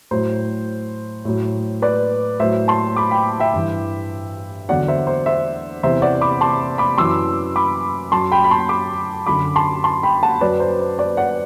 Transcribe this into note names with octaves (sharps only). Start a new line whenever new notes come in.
A2 F#3 C5
A2 F#3
B4 D5
A2 F#3 C5 E5
A5 C6
B5 D6
G5 B5
E5 G5
G2 E3
E2 D3 F#3 D5 F#5
C5 E5
C5
C5 E5
E2 C3 E3 C5 E5
D5 F#5
B5 D6
A5 C6
B5 D6
F#2 E3 C6 E6
B5 D6
F#2 F#3 A5 C6
G5 B5
B5
A5 C6
B5 D6
F#2 D3 F#3 B5 D6
A5 C6
A5 C6
G5 B5
F#5 A5
F#2 F#3 B4 D5
C5
C5
B4 D5
D5 F#5